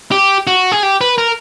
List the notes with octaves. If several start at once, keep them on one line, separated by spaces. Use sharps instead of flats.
G4
F#4
G#4
G4
B4
A#4